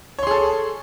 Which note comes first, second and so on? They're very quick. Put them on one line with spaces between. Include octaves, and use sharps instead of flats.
C#5 C6 G#4 A4